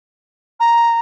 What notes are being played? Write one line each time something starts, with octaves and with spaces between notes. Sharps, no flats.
A#5